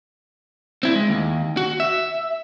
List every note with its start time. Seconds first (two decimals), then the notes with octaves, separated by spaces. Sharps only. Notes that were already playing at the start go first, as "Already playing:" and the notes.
0.83 C4 E4
0.96 G#3
1.09 D#2
1.57 F#4
1.80 E5